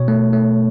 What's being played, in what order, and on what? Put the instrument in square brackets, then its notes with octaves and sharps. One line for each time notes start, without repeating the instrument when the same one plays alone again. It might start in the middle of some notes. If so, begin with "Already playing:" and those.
Already playing: [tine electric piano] B2 C#5
A3
A3